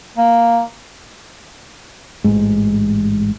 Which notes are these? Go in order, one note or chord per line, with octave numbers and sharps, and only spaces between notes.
A#3
A1 G#2